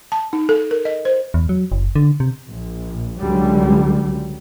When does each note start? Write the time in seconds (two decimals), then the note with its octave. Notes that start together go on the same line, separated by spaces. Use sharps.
0.12 A5
0.33 D#4
0.49 A4
0.71 A#4
0.85 D#5
1.05 C5
1.34 E2
1.49 F#3
1.72 F#1
1.96 D3
2.20 C3
2.47 A#1
3.20 C#2 D3 F#3 G3